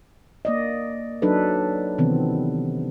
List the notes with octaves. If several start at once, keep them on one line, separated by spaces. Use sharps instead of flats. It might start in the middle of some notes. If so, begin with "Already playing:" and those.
A#3 D5 D#5
F#3 D4 D#4 A4 B4
C3 D#3 E3 B3 C4